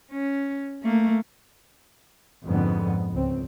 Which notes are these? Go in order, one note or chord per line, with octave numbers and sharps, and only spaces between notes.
C#4
A3 A#3
F2 G#2 D3 B3
C#2 C4